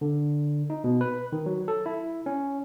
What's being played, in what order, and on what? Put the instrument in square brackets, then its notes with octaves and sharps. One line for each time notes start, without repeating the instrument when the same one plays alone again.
[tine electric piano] D3
D#4
B2
B4
D#3
F#3
A4
E4
C#4